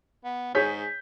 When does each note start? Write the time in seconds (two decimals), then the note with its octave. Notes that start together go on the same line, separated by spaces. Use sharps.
0.25 B3
0.55 G#2 G#4 C#5 G6 B6